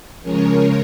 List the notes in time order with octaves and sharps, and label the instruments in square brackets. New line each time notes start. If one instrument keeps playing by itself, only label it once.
[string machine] C#3 F3 G#3 C#4 A#4 C#5